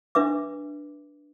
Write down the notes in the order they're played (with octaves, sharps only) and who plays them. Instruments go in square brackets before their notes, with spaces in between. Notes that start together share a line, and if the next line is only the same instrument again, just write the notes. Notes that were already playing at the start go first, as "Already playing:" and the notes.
[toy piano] D4 B4 E5 D6